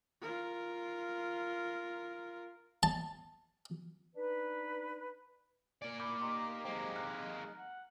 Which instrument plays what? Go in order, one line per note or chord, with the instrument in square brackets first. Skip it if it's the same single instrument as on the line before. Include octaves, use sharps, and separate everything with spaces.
[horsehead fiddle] F4 A#4
[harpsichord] A5
[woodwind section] D4 D#4 B4
[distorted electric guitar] A#3 D5 [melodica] G#5
[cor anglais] E4 [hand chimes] D6 G6
[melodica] D#4 [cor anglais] G4 [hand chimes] C6
[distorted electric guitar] G#3 A#3 [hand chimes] C5 G5 A#5
[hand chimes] F6 F#6
[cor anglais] F#5